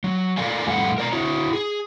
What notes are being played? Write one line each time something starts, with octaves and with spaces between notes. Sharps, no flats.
F#3
A4 A#4 D5 F5 G#5
F2 A2 G3 A4 F5 F#5
A#4 D5 A#5
E4 F#4 C#5
G#4